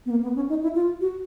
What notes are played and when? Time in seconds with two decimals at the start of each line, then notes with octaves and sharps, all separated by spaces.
0.06 B3
0.10 A#3
0.23 B3
0.36 C#4
0.49 D#4
0.63 E4
0.75 F4
1.01 F#4